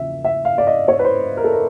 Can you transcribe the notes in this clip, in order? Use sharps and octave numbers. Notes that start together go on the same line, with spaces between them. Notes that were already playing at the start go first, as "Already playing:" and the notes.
Already playing: E2 C#3 F3 A#3 E5
E5
F5
D5
D#5
C#5
B4
C5
A#4
A4
A#4